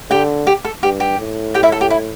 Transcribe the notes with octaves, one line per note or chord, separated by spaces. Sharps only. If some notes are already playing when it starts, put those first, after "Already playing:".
D3 G4 G5
G4
A4
G2 G4
G4
A2
G4 G5
E4 E5
A4
G4
E4